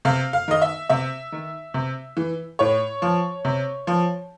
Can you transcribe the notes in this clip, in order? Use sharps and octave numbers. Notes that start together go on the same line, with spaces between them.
C3 F5
F5
D#3 D#5
E5
C3 E5
D#3
C3
E3
A2 C#5
F3
C3
F3